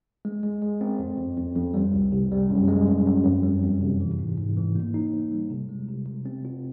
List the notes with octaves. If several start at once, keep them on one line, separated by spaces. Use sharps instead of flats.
G#3
G#3
G#3
C4
F2
F2
F2
F2
G3
C2
C3
G3
F#2
G#3
F#2
F#2
F2
G3
F2
C3
E3
G#2
G#2
E3
A#3
D#4
A#3
G3
C3
G#3
C3
C3
C4
F4